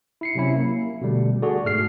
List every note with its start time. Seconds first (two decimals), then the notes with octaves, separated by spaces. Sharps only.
0.21 E4 C7 C#7
0.35 C3 F#3 C#4 E4
0.56 A#3
1.01 B2 D3 G3 A3
1.42 F#4 G#4 A4 D5
1.65 G#2 A3 F6 C7